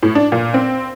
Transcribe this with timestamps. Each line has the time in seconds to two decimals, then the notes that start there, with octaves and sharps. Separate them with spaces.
0.03 A2
0.15 D4
0.32 A#2
0.54 C4